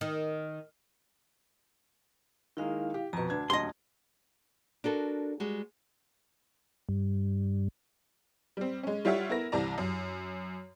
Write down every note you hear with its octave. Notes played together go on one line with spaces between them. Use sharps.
D#3
D#3 G#3 A#3 E4 F5
G4
F2 B2 B4 A#5
D2 D4 A5 G#6
D#1 D2 D#5 C6
D4 F#4 A4 A#4
G3 G#3 F#4
G2
G3 C4
G#3 C#4
G3 F4 G4 C#5 E5 F#5
B3 E4 A#4 A#6
C2 C3 E3 D5 A5 A#5
F#2